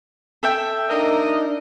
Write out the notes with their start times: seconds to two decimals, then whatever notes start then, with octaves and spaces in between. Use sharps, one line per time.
0.43 A4 E5 G5
0.89 A#3 D4 D#4 A#4 D#5